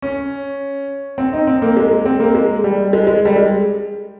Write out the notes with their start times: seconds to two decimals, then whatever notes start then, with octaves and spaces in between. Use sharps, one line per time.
0.02 C#4
1.18 C4
1.33 D#4
1.47 C4
1.62 A#3
1.77 G#3
1.91 G#3
2.06 C4
2.20 A#3
2.35 G#3
2.64 G3
2.93 G#3
3.07 G#3
3.25 G3
3.36 G#3